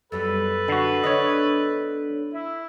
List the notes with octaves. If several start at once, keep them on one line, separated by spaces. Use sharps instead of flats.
F#2 G3 B3 A4 B4
D3 F#4
D3 B3 D4 C#5 D#5
E4 E5